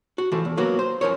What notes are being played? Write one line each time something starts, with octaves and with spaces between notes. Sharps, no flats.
F#4
E3 F3 A3
E2
F#3 A#3 B3 F#4
C5
F#2 F3 A#4 C#5